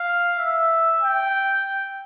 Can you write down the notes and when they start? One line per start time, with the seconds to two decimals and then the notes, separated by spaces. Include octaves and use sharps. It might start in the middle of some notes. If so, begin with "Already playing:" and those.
Already playing: F5
0.38 E5
1.02 G5